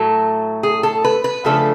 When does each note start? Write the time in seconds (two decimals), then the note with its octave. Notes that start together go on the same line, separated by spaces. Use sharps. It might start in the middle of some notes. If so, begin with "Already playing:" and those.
Already playing: A2 F#3 A3 A4
0.63 G#4
0.83 A4
1.04 B4
1.24 B4
1.45 C#3 F3 A3 D4 A4